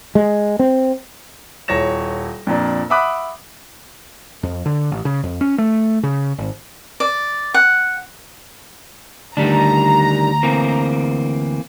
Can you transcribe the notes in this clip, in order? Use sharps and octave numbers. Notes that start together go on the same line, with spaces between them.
G#3
C4
D#1 E4 C#5 A#6 E7
F2 A#2 D4
E5 F#5 B5 D6 D#6 F#6
F2
D3
A1
C#3
F2
C#4
A3
C#3
G#1
D5
F#5
D2 D#3 G3 D4 A#5
E3 A#3 C4